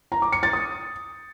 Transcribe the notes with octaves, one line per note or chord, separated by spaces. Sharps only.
A#5
D6
C#7
A6
D#6